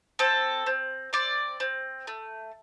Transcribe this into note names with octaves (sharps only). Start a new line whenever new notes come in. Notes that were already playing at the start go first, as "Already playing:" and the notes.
C4 A4
C4
C4 D5
C4
A3